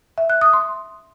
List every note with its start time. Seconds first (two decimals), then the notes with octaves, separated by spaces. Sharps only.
0.18 E5
0.30 F#6
0.41 D#6
0.53 C6